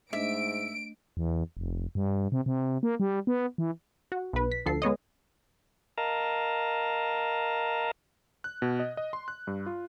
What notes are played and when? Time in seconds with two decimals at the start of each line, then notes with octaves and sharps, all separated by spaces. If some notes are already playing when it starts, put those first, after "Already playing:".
0.13 G#2 A3 D4 D#5 E5 D7
1.17 E2
1.57 F1
1.95 G2
2.32 C3
2.46 C3
2.83 A#3
3.00 G3
3.27 B3
3.58 E3
4.12 F#4
4.33 B1 B4
4.52 B6
4.66 D2 F3 A4 C7
4.82 G#3 B3 C#5 D#5
5.98 A#4 D#5 F5 A5 A#5
8.44 F#6
8.62 B2
8.79 D#5
8.97 D#5
9.13 C6
9.28 F#6
9.47 G2
9.66 F4